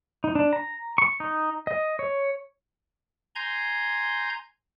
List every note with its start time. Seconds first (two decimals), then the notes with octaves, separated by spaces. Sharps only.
0.24 D#4
0.35 D4
0.53 A#5
0.98 C#6
1.20 D#4
1.67 D#5
1.99 C#5
3.35 G#5 A#5 C6 G6 G#6